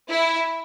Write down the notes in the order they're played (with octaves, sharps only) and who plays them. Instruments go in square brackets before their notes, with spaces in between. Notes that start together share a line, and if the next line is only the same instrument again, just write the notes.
[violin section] E4